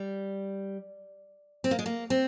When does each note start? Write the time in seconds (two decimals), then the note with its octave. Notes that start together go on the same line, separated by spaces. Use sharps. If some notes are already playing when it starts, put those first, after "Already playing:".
Already playing: G3
1.64 C4
1.71 A#3
1.79 G#3
1.86 A#3
2.10 C4